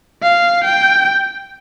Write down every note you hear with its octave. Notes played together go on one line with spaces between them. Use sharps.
F5
G5